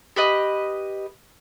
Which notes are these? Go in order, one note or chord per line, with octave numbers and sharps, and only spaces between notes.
G4 B4 D#5